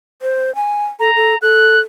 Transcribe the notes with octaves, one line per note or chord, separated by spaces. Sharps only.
C5
G#5
A4 A#5
A4
A4 F#6